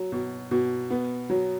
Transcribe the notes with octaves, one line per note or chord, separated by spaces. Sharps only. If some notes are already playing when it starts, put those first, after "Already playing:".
Already playing: F#3
B2
B2
B3
F#3